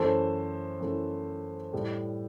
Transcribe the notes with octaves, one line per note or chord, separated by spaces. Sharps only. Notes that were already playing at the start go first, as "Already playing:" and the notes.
Already playing: F#2 E3 A3 A4 C5
F#2 E3 A3
A2 G3